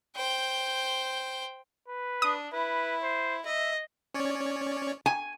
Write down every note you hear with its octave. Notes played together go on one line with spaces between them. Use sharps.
C5 G5
B4
D4 D#6
E4 B4
C5
D#5 E5
C#4 C#5 D5
G#5